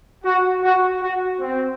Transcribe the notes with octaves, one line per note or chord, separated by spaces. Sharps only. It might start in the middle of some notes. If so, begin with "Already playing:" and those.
F#4
F#4
F#4
C4